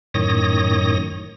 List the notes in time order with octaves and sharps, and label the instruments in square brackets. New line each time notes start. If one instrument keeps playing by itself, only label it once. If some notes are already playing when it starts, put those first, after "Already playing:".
[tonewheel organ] F#2 A2 D#3 C#5 D#6 A#6